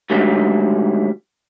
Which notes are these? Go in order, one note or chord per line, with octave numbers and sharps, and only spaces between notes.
G#2 D3 D#3 F#3 G3 A3